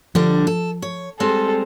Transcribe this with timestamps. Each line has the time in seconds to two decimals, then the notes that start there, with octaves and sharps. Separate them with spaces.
0.15 D3 F3 G3 D4
0.47 A4
0.82 C#5
1.20 G3 G#3 C4 A4